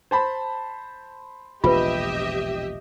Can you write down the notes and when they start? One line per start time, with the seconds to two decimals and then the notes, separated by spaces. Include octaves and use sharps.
0.11 C5 A5 B5
1.64 E1 A#1 C3 F4 G4 B4 D#5 E5